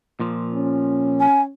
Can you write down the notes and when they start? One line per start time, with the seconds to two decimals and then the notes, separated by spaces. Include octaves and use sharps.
0.20 A#2 F3
0.54 C#4
1.20 G#5